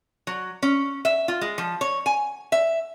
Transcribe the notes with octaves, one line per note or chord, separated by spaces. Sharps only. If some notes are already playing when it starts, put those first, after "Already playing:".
F#3
C#4
E5
F4
G#3
F3
C#5
G#5
E5